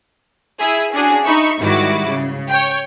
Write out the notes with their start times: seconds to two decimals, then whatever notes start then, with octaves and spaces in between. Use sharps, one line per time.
0.60 E4 G#4 E5
0.92 C#4 D4 F#4 G#4
1.25 D#4 E5 B5 C#6
1.61 G#2 D#3 G3 E4 F#4 D6
2.06 C#3
2.48 C#5 G5